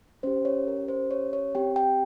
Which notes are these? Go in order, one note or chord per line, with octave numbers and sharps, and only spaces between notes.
C#4 G4 C5
C#5
A#4
C5
C#5
C#5
C4 G4 G5
G5